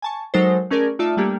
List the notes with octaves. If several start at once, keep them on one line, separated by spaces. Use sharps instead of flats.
G#5 A5 C#6
F#3 G#3 D#4 A4 A#4 C5
A3 C#4 G#4 A#4 D5
A3 D#4 F4 D5 E5 A5
G3 A3 A#3 D4 G4